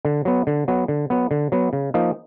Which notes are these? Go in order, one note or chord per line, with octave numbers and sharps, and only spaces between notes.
D3
F#3 B3
D3
F#3 B3
D3
F#3 B3
D3
F#3 B3
C#3
F3 A#3 D#4